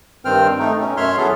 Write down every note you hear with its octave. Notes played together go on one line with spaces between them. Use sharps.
G2 D#3 C4 C5 G5 F6
A3 D#4
B2 C#4
F#2 C#5 E5 C6 F6
E3 F#3 B3 G#4 A4